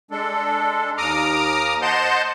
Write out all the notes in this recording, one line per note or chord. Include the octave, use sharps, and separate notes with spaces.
G#3 D4 A4
D#2 A#5 D6 D#6 F6
C5 D#5 F#5 A5 C6 G6